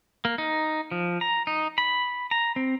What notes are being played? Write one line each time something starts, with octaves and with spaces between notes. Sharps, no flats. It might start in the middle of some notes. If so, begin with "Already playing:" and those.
A#3
D#4
F3
A#5
D#4
B5
A#5
C4